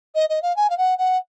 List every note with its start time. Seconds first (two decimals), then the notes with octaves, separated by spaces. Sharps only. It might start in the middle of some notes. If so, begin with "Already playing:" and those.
0.15 D#5
0.29 D#5
0.42 F5
0.56 G#5
0.70 F5
0.78 F#5
0.98 F#5